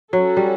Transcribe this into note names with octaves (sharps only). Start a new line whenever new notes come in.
F#3 C#4 F#4 A4
G3